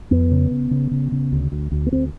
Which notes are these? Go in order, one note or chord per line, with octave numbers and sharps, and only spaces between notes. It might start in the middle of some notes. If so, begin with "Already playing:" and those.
F2 B3
C#3
C#3
C#3
C#3
C#3
D2
D2
D2
B3
D2 C4